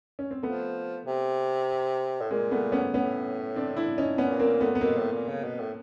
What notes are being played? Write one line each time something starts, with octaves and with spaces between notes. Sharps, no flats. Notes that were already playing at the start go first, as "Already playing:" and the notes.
C#4
C4
F3 A3 B3
C3
A2
A#2 G#3 A#3
A3 B3
B3 C#4
A2 B3 C#4
C4 D4
D4 E4
C#4 D#4
A#2 B3 C#4
A#3 C4
A3 B3
B3
B2 A#3 C4
A2
A#2
C#3
B2
A2